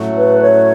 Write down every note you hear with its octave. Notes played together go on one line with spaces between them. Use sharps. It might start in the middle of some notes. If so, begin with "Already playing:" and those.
Already playing: A2 F#3 A3 C#4 F#4
B4
C#5